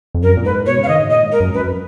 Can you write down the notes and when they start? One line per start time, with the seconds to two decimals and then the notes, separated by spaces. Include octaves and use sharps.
0.15 F2
0.23 F#2 A#4
0.37 A#2
0.45 G#2 B4
0.66 B2 C#5
0.78 C#3
0.83 F5
0.89 D#3 D#5
1.00 G#2
1.10 A#2 D#5
1.25 G#2
1.32 A#4
1.40 F#2
1.54 F#2 B4